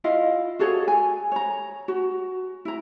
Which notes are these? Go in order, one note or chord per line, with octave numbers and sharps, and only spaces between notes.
E4 F4 D#5 F5
F#4 G#4 A4 C#5
G#5
C#5 A#5
F#4
E4 A#5